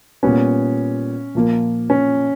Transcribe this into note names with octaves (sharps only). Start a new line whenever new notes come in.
A#2 G3 B3 C#4
A#2 F3 A#3
C#4